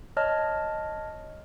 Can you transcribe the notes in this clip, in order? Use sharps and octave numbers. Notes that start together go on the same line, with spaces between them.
C#5 D#5 A5 F6